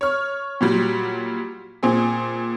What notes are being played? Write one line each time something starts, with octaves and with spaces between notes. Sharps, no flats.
C#5 F6
A#2 F#3 G3
A#2 C4 G#4